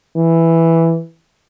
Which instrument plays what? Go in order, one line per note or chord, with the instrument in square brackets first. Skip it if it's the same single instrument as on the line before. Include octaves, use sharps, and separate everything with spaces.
[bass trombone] E3